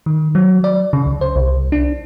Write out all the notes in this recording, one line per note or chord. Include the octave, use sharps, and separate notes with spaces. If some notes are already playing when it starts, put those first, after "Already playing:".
D#3
F#3
D5
C#3
C#2
C5
C2
D4